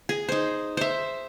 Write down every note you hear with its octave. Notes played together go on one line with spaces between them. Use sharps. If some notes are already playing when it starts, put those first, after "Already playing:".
G#4
D#4 C5
C5 E5